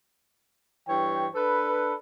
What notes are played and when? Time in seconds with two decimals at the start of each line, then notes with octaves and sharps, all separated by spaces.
0.88 G2 E3 C#5 G5
1.35 D4 A4 B4